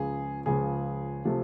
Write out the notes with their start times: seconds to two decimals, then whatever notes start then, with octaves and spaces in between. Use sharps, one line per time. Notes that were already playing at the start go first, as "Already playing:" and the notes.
Already playing: C#2 C#3 F3 G#4
0.46 C#2 C#3 F3 G#4
1.25 C3 F3 A3